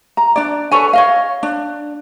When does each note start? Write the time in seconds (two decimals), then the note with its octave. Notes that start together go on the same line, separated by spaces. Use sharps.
0.17 A#5
0.36 D4 D5
0.71 A4 B4 C#5 G#5
0.93 C#5 D#5 F5
1.43 D4